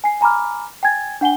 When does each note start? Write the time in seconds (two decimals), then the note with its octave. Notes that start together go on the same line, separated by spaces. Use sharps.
0.04 G#5 C7
0.21 G#5 A#5 B5 D6 F6
0.83 G5 G#5 G#6 A6
1.21 D4 F#5 G#5 G7